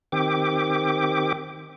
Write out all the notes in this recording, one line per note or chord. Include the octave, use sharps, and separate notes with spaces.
D#3 C4 G4 D6